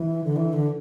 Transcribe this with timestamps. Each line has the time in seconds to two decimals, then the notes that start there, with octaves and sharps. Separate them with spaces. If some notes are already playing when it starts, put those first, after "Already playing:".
Already playing: E3
0.24 D3
0.36 E3
0.53 D3